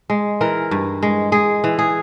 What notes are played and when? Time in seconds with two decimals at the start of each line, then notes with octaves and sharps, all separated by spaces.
0.10 G#3
0.41 E3 A#4
0.71 G2
1.02 G#3
1.32 G#3 G#4
1.64 E3
1.79 G#4